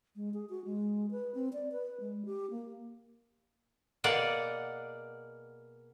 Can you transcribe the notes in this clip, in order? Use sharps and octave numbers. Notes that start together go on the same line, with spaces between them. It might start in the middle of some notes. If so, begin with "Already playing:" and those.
G#3
G#4
F#4
G#3
B4
C4
D5
B4
G#3
G4
A#3
B2 A#3 G#4 D5 F#5